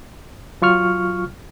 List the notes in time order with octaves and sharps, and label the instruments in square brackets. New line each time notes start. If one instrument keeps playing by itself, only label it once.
[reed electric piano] F#3 F4 C#6 F6